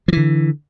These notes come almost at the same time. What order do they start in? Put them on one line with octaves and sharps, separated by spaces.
F3 E3 D3